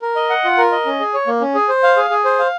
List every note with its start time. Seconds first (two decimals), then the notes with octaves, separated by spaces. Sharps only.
0.02 A#4
0.16 D#5
0.30 F#5
0.45 F4
0.58 A#4
0.72 D#5
0.86 C#4
1.00 G#4
1.14 C#5
1.27 A#3
1.41 C#4
1.55 G#4
1.69 C5
1.83 F5
1.97 G#4
2.10 G#4
2.25 C5
2.39 F5